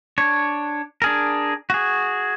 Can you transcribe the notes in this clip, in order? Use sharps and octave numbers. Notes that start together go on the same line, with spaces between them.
D4 C#5
D4 G#4 A#4
F#4 G#4